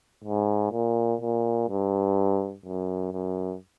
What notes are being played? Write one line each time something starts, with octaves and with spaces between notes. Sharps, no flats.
G#2
A#2
A#2
G2
F#2
F#2